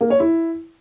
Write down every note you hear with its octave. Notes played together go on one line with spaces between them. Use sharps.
A#3
C#5
E4